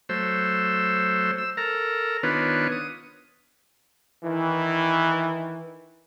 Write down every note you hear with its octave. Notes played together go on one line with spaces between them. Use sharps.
F#3 A3 C5 E6
E6
A4 A#4 A#5
D#3 B3 D4 F4 B4 C#5
D#6
D#3 E3